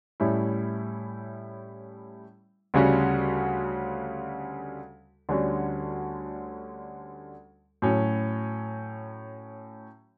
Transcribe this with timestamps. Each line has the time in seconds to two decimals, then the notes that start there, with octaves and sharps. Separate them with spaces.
0.20 A2 G3 C#4 E4
2.74 D2 C#3 G3 C#4 F#4
5.29 D2 D3 G3 C#4 F#4
7.82 A2 F#3 C#4